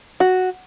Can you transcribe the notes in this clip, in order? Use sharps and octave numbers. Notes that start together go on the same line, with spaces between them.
F#4